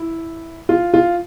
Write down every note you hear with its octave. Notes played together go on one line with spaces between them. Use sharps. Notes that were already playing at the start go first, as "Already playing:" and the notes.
Already playing: E4
F4
F4